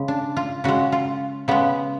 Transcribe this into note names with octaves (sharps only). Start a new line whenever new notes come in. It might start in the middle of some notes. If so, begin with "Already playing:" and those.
Already playing: C#3 G#3
D4
F4
C#3 G#3 F#4
F4
C#3 G#3 B3